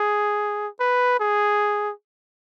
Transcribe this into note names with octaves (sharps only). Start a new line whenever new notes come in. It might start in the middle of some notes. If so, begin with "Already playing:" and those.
Already playing: G#4
B4
G#4